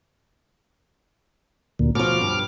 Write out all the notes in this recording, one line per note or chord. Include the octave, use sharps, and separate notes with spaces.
D2 A#2
B2 F3 D6 F6
G2